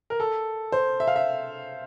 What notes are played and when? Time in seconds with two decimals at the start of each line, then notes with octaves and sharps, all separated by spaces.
0.10 A#4
0.20 A4
0.72 C5
1.00 E5
1.07 F5
1.16 E5